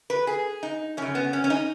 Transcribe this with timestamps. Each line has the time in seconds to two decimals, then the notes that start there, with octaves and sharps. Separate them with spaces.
0.10 B4
0.27 G#4
0.63 D#4
0.97 F#2 C#3 C#4
1.15 B3
1.33 C#4
1.44 C#4
1.50 D#4